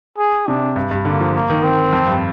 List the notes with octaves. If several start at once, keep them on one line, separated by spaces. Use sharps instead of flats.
G#4
C3 D4
G2
G2
D3 A#3
F3
A#3
D#3
C4
F2
G2